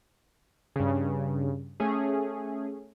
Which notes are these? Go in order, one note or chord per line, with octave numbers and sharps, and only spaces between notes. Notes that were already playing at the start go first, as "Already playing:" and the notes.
G2 C#3
A3 C#4 G#4